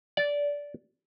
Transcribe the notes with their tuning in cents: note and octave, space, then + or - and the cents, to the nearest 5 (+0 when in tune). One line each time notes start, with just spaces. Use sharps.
D5 -15